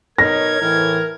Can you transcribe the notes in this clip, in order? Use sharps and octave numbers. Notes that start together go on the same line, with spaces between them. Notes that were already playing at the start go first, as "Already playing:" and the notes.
B2 D#4 A#4 C#5 G#6 A#6
A2 E3 A#4